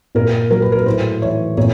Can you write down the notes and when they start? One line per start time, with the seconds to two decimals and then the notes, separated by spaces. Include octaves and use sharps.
0.15 A#2 A#4
0.51 F#3 A#4
0.62 B4
0.72 A#4
0.86 A2 C5
1.22 E3 C#5
1.57 A#2 C#5